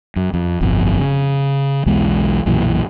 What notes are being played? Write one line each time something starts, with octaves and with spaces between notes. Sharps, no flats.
F#2
F2
D1 G1 F2 B2
C#3
B1 E2 G#3
B1 F#2 A#2 E3